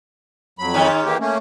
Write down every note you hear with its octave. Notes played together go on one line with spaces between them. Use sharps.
F2 F#3 B5
G#2 D#3 C#4
E3 A#3 G4
A3 A#3 C#4